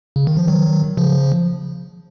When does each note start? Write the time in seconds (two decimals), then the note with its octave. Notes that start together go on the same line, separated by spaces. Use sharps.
0.16 C#3
0.27 D#3
0.37 F3
0.47 D#3 F#3
0.97 C#3 F3